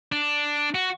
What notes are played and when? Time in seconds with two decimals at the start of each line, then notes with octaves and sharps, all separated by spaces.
0.12 D4
0.75 F#4